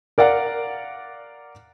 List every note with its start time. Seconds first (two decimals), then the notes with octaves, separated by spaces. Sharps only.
0.18 A#4 D5 F5 F#5